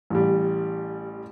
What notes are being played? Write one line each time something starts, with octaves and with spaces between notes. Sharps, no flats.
A1 G3